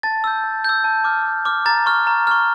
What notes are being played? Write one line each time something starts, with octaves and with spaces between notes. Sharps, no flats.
A5 A6
E6 G6
A5
E6 G6
A5
D6 F6
A5
D6 F6
A#5 A6
C#6 F6
A#5
C#6 F6